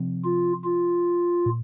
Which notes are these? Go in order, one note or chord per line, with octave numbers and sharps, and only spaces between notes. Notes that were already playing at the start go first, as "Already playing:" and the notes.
Already playing: C3 F3 C4
F4
F4
A#2